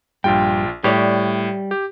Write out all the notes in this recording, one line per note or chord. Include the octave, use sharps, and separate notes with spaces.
A#1 G2 F4 G5
A2 G3 C#5 D5
G4